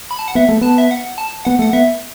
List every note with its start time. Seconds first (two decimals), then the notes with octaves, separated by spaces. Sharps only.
0.11 B5
0.19 A5
0.28 F#5
0.35 B3 E5
0.49 A3
0.61 B3 A5
0.78 E5
0.91 F#5
1.18 A5
1.45 B3 F#5
1.59 A3 F#5
1.73 B3 E5